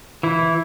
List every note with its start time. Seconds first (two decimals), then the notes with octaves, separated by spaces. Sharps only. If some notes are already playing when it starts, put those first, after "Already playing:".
0.23 E3 E4